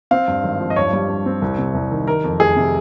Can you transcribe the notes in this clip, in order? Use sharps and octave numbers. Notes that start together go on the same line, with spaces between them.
C4 F5
G2
G#1
F3
D#5
G2 C#5
G3
G2
C4
C2
C3
C2
D#3
D#3 A#4
F2
F1 G#4
C3